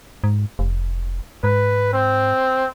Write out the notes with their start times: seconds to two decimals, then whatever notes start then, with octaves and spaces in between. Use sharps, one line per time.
0.24 G#2
0.59 F1
1.44 G#2 B4
1.93 C4